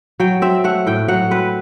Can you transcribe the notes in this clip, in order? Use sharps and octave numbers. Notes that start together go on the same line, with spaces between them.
F#3 G5
C4 E5
A3 F#5
A2 G5
F#3 F#5
C4 B4